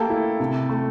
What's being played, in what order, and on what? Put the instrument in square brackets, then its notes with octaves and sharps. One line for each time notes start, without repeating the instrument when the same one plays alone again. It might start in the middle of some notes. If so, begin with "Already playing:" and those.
Already playing: [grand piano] A3 A#3 [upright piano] G4 A4
[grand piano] E4
C3
A3